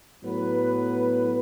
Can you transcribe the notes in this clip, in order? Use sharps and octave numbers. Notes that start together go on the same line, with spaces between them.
A2 F#3 B3 B4